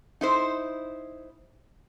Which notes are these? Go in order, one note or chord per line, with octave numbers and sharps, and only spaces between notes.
D#4 E4 C5